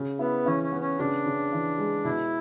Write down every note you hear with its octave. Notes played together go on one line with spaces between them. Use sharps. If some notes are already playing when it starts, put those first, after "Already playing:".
Already playing: C#3
B3 E4
E3 C#4
C#4
B3
C#4
C#3 D4
C#3
E3
G#3
B2 E4